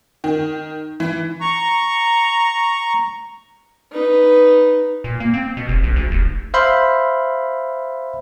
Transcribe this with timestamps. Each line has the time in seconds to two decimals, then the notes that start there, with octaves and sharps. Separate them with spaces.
0.24 D#3
1.00 E3
1.41 A#5 C#6
3.92 D#4 B4
5.04 A#2
5.20 A#3
5.34 C4
5.57 B2
5.69 F1
5.84 A#1
5.96 D2
6.11 F1
6.54 C5 E5 F5 B5 C6